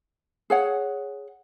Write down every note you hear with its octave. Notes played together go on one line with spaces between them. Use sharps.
G#4 C#5 F#5